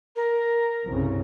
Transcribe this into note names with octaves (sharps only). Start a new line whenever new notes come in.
A#4
C2 G2 C#3